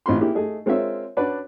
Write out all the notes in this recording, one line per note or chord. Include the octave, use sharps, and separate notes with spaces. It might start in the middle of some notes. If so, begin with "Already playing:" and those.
A1 C4 D#4 F4 B5 C6
A#3 E4 G4 G#4
A3 G#4 D#5
G#3 C4 F4 A#4 C#5 E5
C#4 D4 F#4 B4 D5